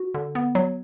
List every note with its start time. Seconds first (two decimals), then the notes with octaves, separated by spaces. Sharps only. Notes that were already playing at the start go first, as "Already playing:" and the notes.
Already playing: F#4
0.14 D3
0.35 B3
0.55 F#3